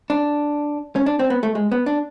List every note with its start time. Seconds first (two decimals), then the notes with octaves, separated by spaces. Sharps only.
0.10 D4
0.96 C#4
1.06 D4
1.19 C4
1.30 B3
1.43 A3
1.55 G#3
1.72 B3
1.86 D4